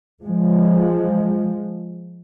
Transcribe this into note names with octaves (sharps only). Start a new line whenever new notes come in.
F3 G#3